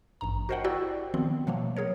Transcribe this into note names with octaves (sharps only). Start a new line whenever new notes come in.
A1 G2 A#5
F#4 A#4 C5 D#5 F#5 G5
E4 F#4 G4 D5 G5 E6
D#3 F3 B3 C4
B2 F3 F#3 A3 A#3
F#3 G#4 A#4 C#5